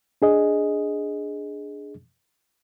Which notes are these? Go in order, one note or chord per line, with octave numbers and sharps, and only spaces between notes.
D4 G#4 D#5